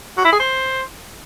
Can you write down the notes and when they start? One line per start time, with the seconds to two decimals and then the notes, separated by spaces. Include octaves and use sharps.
0.17 F#4
0.25 E4
0.32 G#4
0.40 C5